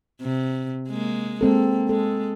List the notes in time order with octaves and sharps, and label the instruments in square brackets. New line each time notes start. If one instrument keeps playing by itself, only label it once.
[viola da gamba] C3
G#3 A#3
[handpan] G#3 C4 A4 [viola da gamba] A#3
[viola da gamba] G#3 [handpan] A4